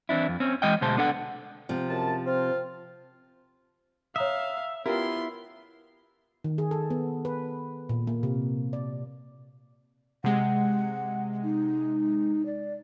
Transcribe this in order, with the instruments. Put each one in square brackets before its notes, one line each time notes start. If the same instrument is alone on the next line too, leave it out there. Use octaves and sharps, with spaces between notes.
[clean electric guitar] E3 C4 D4 E4
F2
C4 C#4
E3 G#3 D#5 G5
D2 B2 G#3 C5 A5
B3 D4 A4 F#5
[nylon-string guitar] C3 F3
[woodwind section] F#2 A5
C4 F4
[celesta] C#5 A#5 D#6 [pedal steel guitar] E5 [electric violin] F5
[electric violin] B3 C6 [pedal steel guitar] E4 [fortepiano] F4 G4 A#4 [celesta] F6
[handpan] D#3
G#4
A4
B3
B4
A#2
A#3
C3
D5
[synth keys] C3 G#3 [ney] F#5
[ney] D#4
D5